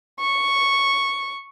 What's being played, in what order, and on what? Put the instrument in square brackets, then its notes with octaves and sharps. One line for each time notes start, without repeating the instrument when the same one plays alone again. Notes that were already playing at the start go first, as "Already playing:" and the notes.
[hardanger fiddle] C#6